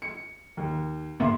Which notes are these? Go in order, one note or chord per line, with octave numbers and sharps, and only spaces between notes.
C#7
D#2
G#2 A#3 B3 E5 C6 D6